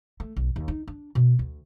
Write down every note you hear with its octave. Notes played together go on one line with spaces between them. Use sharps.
A3
B1
D#2
D#4
D4
B2
D2